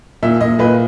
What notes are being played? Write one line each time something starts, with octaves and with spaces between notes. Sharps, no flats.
A#2 E5
A#2 D#5
A#2 B4